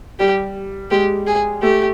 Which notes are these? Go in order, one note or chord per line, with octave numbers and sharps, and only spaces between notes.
G3 G4
G#3 G4
G#4
A3 G4